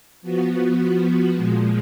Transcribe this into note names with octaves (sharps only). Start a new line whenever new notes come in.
F3 B3 F#4
A#2 F3 G#3